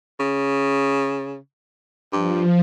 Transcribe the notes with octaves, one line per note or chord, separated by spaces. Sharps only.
C#3
G2 F3